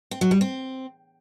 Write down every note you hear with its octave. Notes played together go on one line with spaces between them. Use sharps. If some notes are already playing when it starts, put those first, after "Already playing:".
C4
F#3
G3
C4